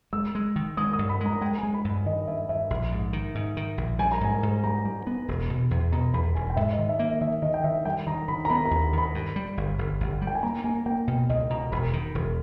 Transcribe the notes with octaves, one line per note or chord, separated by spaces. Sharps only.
G#3 E6
G#3
D#3
G#3 D#6
D#6
G2
B5
G#3
A#5
G#3 G5
G#5
G#3
B5
G2
B5
D#3 D#5
G2 E5
G2 E5
A#1
G#2
D#3
G#2
D#3
A#1
G3 G#5
A#5
G#2 G#5
G#2
G3 A#5
G3
B3
E1
B2
E2
B2 A#5
E2 B5
E1 G#5
G5
G#2 E5
D#5
D#3
E5
A#3
E5
D#3 E5
D#3 D#5
G5
D#3 E5
G3 G5
D#3 A#5
D#3 B5
A#5
B3 B5
A#5
D#2
D#3 B5
G2
G3
G1
G1
G1
G3
G5
G#5
A#3 A#5
A#3 G#5
A#3 G5
B2 G5
C#2 D#5
B2 A#5
E1 B5
D#3
E1